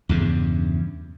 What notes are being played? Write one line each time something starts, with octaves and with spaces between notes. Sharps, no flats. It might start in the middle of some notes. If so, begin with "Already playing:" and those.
E2 G2 C#3